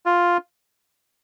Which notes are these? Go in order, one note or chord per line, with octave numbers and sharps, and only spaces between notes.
F4